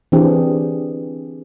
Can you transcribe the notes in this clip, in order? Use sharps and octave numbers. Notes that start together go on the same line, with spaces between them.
E3 C4 D4 G4 G#4